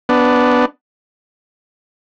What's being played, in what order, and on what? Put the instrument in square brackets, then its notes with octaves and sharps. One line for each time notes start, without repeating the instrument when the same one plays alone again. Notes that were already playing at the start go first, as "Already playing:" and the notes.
[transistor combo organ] B3 D4